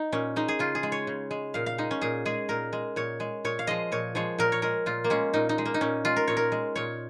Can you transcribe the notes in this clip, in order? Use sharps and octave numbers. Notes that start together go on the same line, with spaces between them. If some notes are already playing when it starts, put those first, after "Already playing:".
Already playing: D#4
A#2 C#4
G#3 D#4
G#4
C#3 F4
G#4
G#3
C#5
C#3
G#3
A#2 F5
F5
G#3 D#4
C#4
A#2 G#4
G#3 G#4
A#2 A#4
G#3
A#2 C#5
G#3
A#2 C#5
F5
F3 G#3 D#5
A#2 C#5
F3 G#3 C#5
A#2 A#4
C#5
G#3 A#4
A#2 F4
A#3
G#3 C#4
A#2 D#4
D#4
G#3
A#3
D#4
A#2 C#4
G#3 F4
A#4
A#2 C#5
A#4
G#3
A#2 C#5